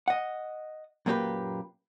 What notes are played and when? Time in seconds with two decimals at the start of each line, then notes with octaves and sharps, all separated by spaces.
0.08 D#5 F#5
1.06 F#2 A#2 A#3 C#4 G4 B4